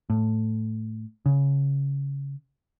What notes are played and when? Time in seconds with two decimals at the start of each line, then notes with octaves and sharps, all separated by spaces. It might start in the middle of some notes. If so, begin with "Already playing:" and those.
0.10 A2
1.26 C#3